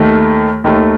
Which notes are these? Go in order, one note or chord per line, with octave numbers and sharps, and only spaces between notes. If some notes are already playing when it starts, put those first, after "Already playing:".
Already playing: D#2 D#3 A3
D#2 D#3 A3